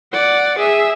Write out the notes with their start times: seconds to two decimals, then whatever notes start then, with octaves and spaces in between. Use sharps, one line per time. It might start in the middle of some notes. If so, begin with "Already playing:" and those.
0.13 D5 F#5
0.58 G#4 E5